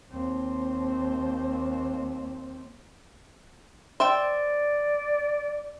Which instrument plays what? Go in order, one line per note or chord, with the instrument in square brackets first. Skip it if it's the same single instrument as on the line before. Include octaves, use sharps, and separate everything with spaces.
[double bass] D#2 C4
[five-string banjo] C5 E5 G5 [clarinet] D5